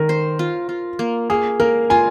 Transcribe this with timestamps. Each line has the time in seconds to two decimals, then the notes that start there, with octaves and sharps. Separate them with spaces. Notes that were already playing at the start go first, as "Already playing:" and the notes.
Already playing: D#3 A#4
0.09 C5
0.39 F4
0.69 F4
0.99 A#3
1.30 A#3 G#4
1.60 A#3 A#4
1.90 F4 G#5